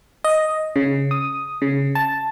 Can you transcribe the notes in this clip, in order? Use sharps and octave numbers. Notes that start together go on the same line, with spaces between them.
D#5
C#3
D#6
C#3
A5